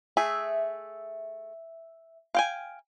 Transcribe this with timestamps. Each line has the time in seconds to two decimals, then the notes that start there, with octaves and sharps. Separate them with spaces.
0.17 A3 G#4 E5
2.35 F5 G5 G#5